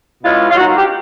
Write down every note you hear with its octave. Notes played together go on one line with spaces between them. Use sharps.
B2 G#3 C#4 E4 F4
F4
F#3 A#3 D#4 F#4
F#4
G4